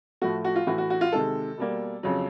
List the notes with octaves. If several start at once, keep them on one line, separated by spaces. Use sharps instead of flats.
A2 F3 A3 F#4
F#4
F4
A2 E3 A3 F#4
F#4
F#4
F4
C3 D#3 G#3 A4
B2 G3 A#3
F2 C#3 F#3